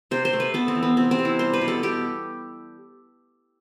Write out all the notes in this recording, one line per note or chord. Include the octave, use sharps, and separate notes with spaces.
C3 C5
C5
A3
B4
B3 A4
C4
E3
B3
C3 C4
C4
C3
E4
G3 C5
B4
B2
A4
B2 G4